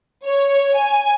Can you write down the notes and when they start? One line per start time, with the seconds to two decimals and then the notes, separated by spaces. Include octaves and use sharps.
0.24 C#5
0.74 G#5